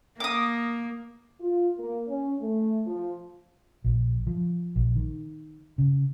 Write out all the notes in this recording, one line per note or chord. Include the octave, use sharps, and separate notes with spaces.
A#3 D6 D#6
F4
A#3
C#4
A3
F3
A#1
F3
A#1
D#3
C#3